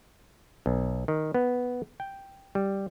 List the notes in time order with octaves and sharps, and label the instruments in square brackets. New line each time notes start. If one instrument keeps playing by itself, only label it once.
[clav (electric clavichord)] B1
D#3
B3
G5
G3